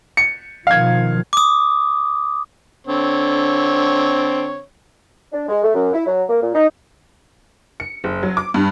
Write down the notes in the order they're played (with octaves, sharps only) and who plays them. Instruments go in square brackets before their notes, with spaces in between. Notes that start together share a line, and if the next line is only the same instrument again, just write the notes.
[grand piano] C#7
[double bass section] B2 D#3 F3 [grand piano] F5 G#6
[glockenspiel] D6 D#6
[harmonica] D3 C4 C#5
[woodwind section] D4
G#3
A3
F#2
E4
F#3
A#3
A#2
D#4
[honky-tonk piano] C#7
F#1
F#3
D6
G2